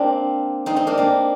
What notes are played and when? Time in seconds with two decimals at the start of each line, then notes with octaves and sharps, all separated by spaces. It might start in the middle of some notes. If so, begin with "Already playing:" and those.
Already playing: A#3 C4 D4
0.66 C4 D#4
0.76 C4 D#4
0.87 A#3 D4
0.97 A#3 D4